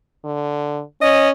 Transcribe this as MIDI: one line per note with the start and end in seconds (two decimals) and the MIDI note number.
0.25 0.82 50
1.02 1.31 61
1.02 1.29 75